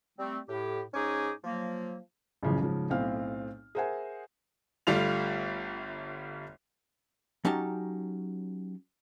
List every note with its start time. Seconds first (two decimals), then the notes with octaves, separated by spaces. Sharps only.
0.18 G3 A3 C4
0.48 A2 G4
0.94 G#2 C#4 D#4 G#4 G#5 D6
1.44 F3 F#3 A#3
2.43 A1 F#2 C#3 E3 F3
2.61 G#2 C#3 F3
2.90 B1 A2 C4 F5 F6
3.75 G#4 A#4 C5 E5 F#5 G#5
4.87 G1 G3 A3 F4 F7
7.45 F#3 C#4 D#4 G4 A5